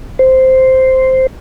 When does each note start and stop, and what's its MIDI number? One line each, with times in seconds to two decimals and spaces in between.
0.19 1.27 72